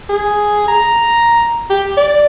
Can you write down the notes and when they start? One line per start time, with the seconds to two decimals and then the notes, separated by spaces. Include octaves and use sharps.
0.09 G#4
0.68 A#5
1.70 G4
1.97 D5